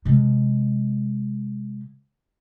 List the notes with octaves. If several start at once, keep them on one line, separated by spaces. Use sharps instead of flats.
C3 G#3